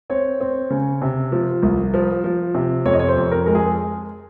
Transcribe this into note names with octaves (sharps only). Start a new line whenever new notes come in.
C4 C#5
C4
C#3
C3
F3
C2
F3
F3
C3
F2 C#5
D#5
C#5
C5
F2
A#4
G#3 A#4
G#4